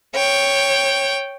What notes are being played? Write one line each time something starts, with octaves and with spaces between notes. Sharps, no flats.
C#5 G5